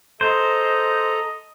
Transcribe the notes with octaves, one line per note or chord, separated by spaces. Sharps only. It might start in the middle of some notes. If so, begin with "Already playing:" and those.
A4 C5 D#5 A#5